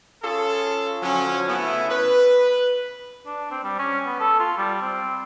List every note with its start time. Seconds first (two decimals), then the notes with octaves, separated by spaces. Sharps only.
0.23 C#4 F4 G#4 A4
1.03 D3 F3 F#3 C#4
1.48 C#3 A3 B3 C#4 E4
1.90 B4
3.26 D4
3.51 C4
3.64 G3
3.79 C#4
4.06 B3
4.20 A4
4.39 F4
4.57 G3
4.81 C4